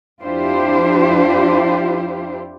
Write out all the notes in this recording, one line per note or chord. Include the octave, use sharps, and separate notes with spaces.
F2 D4 E4 F4 G4 C5